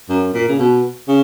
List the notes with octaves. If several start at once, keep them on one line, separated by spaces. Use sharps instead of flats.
F#2
A#2
C#3
B2
C#3